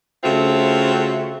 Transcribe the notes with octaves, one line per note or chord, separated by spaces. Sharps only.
C#3 A3 C4 F4 F#4 E5